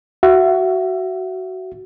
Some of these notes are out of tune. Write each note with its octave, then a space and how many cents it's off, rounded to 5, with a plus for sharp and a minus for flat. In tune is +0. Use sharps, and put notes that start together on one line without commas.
F#4 +15 E5 +30